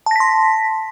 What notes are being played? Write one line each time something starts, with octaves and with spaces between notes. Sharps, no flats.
A5 C6 A#6 B6